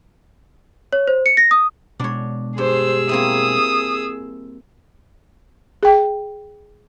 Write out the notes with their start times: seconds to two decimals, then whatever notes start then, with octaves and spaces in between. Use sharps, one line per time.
0.93 C#5
1.08 C5
1.26 C#7
1.37 A#6
1.51 D#6
1.99 B2 G#3 D4 C#5
2.58 G2 G#4 C5 E6
3.09 A#3 C4 E4 D#6
5.83 G#4 G5